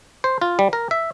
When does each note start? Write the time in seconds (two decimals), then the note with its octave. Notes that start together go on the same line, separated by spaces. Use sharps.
0.24 C5
0.41 F4
0.59 G3
0.73 A#4
0.91 E5